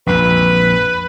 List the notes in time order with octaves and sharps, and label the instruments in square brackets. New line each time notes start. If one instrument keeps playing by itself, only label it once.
[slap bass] A#1 F2 [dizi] B4